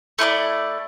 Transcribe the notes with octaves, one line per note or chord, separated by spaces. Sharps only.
A3 E4 A#4 D5